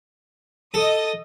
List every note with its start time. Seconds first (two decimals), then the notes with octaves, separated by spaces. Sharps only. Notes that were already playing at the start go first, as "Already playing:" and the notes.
0.74 A4 D#5 D#6